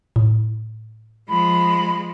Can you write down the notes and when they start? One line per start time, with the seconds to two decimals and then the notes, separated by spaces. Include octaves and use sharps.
0.16 A2
1.28 F3 G#3 B5